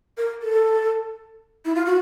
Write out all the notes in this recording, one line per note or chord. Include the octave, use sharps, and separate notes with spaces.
A#4
A4
E4
F4
F#4